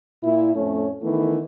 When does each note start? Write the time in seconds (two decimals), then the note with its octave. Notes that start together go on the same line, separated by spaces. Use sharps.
0.23 A#2 E4
0.55 F2 A2 A3 C#4 C#5
1.02 D#3 E3 A3 B3 E4